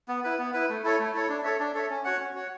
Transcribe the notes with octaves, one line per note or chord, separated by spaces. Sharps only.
B3
E4 B4
B3
E4 B4
A3
E4 A4 C#5
A3
E4 A4 C#5
D4
A4 C#5 E5
D4
A4 C#5 E5
C#4
F#4 C#5 F#5
C#4
F#4 C#5 F#5